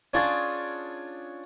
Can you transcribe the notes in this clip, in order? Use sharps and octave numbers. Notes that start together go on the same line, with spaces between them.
C#4 D4 F4 G#4 D5